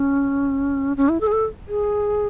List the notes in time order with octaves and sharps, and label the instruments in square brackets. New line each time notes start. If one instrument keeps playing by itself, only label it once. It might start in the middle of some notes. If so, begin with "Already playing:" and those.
Already playing: [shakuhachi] C#4
C#4
E4
A4
G#4
A4
G#4